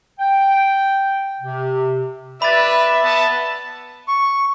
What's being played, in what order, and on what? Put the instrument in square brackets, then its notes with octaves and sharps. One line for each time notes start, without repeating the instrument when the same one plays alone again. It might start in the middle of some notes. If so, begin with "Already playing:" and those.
[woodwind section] G5
C3
[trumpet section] B4 D5 [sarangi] E5 [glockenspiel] B5 A6
[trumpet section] B3 A5
[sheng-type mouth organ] C#6